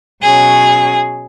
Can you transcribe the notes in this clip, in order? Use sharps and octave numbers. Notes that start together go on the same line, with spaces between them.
B2 F#3 C#4 G#4